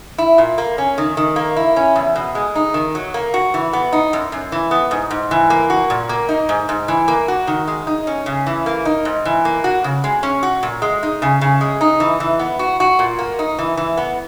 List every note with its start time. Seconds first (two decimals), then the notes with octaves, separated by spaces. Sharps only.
0.18 E4
0.38 A#2
0.58 A#3
0.78 C#4
0.98 D#3
1.17 D#3
1.36 A#3
1.56 E4
1.76 C#4
1.96 E2
2.16 B2
2.35 G#3
2.55 D#4
2.74 D#3
2.95 F#3
3.14 A#3
3.34 F#4
3.54 E3
3.73 B3
3.93 D#4
4.13 F#2
4.32 F#2
4.52 E3
4.71 B3
4.91 G#2
5.11 G#2
5.31 E3
5.50 A#3
5.70 F#4
5.90 A#2
6.09 A#3
6.29 D#4
6.49 G#2
6.69 G#2
6.88 E3
7.08 A#3
7.28 F#4
7.47 D#3
7.68 G#3
7.87 D#4
8.07 C#4
8.26 C#3
8.47 E3
8.66 A#3
8.85 D#4
9.05 G#2
9.25 E3
9.45 A#3
9.64 F#4
9.84 C#3
10.04 G#3
10.23 C#4
10.43 F#4
10.63 A#2
10.82 G#3
11.03 D#4
11.22 C#3
11.41 C#3
11.61 G#3
11.81 D#4
12.00 E3
12.20 E3
12.39 B3
12.59 F#4
12.80 F#4
12.99 A#2
13.19 A#3
13.39 D#4
13.59 E3
13.77 E3
13.97 B3